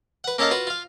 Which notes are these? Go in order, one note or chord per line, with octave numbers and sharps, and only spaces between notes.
B4 F#5
A#3 C#4 A4 D#5 F5 A5
F4 F#4 B4
F4 F5